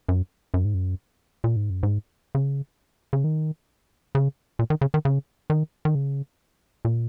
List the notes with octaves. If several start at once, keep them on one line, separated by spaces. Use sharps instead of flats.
F#2
F#2
G#2
F#2
A#2
G#2
F#2
G#2
C#3
C#3
D#3
C#3
A#2
D#3
C#3
D#3
C#3
D#3
D#3
C#3
A#2